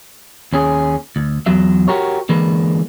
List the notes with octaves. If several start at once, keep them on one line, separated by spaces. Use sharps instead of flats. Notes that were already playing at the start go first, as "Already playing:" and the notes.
D#2 C#4 G#4
D2
E2 F#3 E5
F#4 G4 A#4 C#5
D3 E3 G#3 A#3 B4